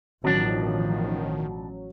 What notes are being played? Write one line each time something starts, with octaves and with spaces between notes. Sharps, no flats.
A1 B2 D#3 F3 F#3 C#4 D4